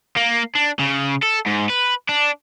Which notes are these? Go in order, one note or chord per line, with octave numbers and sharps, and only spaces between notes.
A#3
D4
C#3
A4
G#2
B4
D4